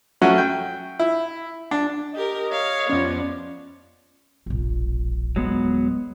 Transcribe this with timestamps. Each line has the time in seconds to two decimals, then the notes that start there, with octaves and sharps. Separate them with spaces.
0.21 F#3 A3 C#4 F#4
0.38 G5
0.99 E4
1.71 D4
2.15 G4 A#4 D#5
2.52 C#5 F5
2.90 F2 F3 B3 C#4 D5
4.46 E1 A#1
5.36 D#2 A#2 F#3 G#3 B3